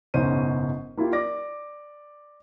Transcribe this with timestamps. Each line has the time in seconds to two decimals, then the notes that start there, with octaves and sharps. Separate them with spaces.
0.14 F#1 G#2 B2 C#4 C5 D#7
0.97 A#3 E4 F4 G4
1.13 D5 D6 A#6